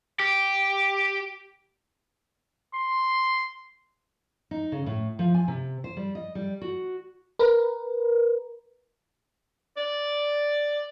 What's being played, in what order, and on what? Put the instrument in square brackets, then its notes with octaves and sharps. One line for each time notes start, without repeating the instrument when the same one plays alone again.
[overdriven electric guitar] G4
[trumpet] C6
[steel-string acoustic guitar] D#4
C#3
A2
F3
G#5
C3
C5
G3
D#5
G3
F#4
[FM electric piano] A#4 B4
[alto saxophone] D5